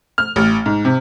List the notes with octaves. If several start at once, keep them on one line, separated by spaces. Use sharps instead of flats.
F6
A1
G#2
C3